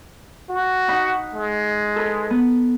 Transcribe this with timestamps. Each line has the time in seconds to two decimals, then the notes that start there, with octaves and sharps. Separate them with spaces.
0.50 F#4
0.88 D#4 F#5 B5
1.34 G#3
1.96 A4 B4
2.30 B3